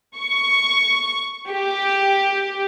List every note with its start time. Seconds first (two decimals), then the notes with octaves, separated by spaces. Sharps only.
0.17 C#6
1.50 G4